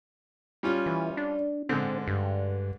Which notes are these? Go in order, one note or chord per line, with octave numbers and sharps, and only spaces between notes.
G3 C#4 F4
E3
D4
G#2 D3 C4
G2